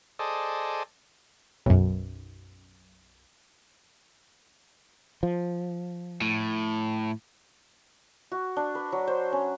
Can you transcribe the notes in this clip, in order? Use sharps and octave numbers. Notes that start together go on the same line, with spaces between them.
G#4 A4 C5 D5 D#5
B1 F#2
F3
A2
F#4
D4
B4
F#3
C5
C#4